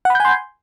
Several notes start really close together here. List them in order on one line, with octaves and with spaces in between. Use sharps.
F#5 B5 G6 G#5 C6